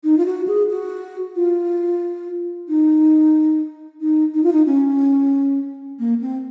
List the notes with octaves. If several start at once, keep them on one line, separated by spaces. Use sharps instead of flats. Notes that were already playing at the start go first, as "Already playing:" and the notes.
D#4
F4
F#4
G#4
F#4
F4
D#4
D#4
D#4
F4
D#4
C#4
A#3
C4